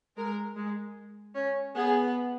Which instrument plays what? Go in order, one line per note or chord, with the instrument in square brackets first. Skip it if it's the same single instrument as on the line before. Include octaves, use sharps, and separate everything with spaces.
[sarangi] G#3 [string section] A#4
[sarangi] G#3
C#4
[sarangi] B3 [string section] G#4